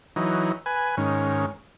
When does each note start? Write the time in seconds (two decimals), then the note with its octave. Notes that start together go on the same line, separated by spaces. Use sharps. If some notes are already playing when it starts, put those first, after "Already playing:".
0.16 E3 F#3 D#4
0.66 B4 G#5
0.97 G#2 D#3 C#4